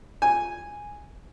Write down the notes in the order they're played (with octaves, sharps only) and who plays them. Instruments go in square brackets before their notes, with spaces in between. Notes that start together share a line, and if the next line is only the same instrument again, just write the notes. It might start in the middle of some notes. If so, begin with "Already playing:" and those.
[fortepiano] G#5